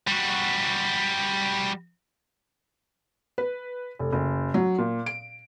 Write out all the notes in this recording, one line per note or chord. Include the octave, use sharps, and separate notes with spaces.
G3 F#4
B4
F1
F#1
F#3
A#2
D7